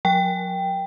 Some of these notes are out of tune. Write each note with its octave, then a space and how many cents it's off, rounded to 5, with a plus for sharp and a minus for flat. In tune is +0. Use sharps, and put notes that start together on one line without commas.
F#3 -35 G5 +0